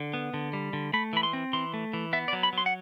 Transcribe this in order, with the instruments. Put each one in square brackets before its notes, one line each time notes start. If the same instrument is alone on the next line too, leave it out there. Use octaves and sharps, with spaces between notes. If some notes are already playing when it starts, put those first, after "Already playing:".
Already playing: [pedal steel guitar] D3
B3
D3
G3
D3
A3 B5
E3 B5
C6
C4
E3 C6
A3
E3
B3 E5
D5
F#3
B5
F#3 C6
F#5